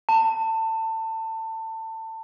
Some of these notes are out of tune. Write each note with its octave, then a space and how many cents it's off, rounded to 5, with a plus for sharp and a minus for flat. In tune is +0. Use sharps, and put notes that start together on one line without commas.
A5 +25